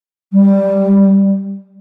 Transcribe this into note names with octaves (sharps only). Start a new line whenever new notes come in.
G3